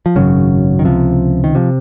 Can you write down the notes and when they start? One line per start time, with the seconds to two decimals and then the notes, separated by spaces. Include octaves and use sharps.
0.06 F3
0.16 G#1 F#2 C#3 F#3
0.79 D#3
0.85 C#2 C3 F3
1.44 D#3
1.55 C3 F3